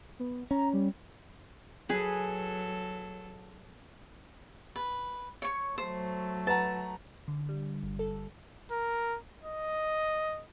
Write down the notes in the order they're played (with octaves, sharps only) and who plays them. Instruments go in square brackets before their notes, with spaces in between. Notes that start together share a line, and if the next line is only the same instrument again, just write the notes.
[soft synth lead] B3
[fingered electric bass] C#4 [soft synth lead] A#5
[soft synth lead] G3
[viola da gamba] F#3 A4 [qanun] G#4 B4
[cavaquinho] B4
C#5 C#6
[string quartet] F#3 A3 [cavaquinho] C5
[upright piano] B4 F#5 A#5 [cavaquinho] A5
[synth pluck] D3
G3
G1
A4
[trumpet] A#4
D#5